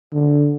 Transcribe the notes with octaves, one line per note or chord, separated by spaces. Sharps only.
D3